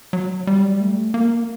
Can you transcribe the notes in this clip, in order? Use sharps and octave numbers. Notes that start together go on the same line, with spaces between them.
F#3
G3
A3
A#3